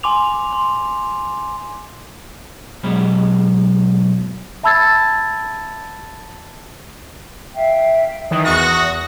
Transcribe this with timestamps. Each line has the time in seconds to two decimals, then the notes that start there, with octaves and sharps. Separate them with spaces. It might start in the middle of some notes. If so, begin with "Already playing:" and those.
0.03 G#5 C6 D6 F7
0.53 C6
2.83 B2 F#3 G#3 B5
4.63 E5 A5 B5 E6 G#6 A6
7.54 E5 F5 G5
8.31 D#3 E3 D#6
8.45 E2 F#4 C#6 A#6